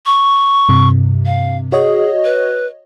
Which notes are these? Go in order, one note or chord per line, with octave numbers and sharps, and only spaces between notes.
C#6
G2 C3
F5
F#4 G#4 C#5 D#5
B4